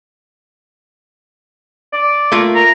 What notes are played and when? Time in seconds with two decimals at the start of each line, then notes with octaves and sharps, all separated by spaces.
1.93 D5
2.32 A3 A#3 F4
2.55 A#4